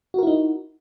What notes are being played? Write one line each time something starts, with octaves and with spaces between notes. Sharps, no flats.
D#4 E4 F#4 A#4